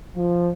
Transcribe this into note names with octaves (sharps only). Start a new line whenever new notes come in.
F3